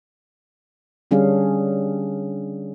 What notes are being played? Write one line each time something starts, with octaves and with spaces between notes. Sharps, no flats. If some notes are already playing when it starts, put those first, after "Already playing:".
D3 G3 C#4 D4 G#4 F5